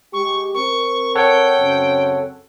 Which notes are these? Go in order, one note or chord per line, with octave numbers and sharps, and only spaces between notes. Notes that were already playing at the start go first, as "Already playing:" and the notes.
G#3 G4 C#6
C4 A#4 C#6
A4 C#5 F#5 G5
F#2 C#3 C4